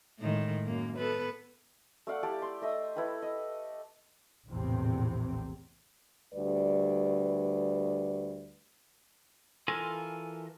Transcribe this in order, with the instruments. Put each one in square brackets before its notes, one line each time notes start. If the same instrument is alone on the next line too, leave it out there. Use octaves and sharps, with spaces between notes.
[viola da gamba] A2 D#3 G#3
F#2 A#3
B3 A4 B4
[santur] A3 D5 F5 F#5
E4 G4 D5 A5
C6
A3 D#5 E5 D#6
E4 A4 B4 G5
D#5
[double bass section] A#1 E2 A2 C3 C4
[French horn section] D2 G3 B4 D5
[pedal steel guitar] E3 F4 A4 A#4 G#5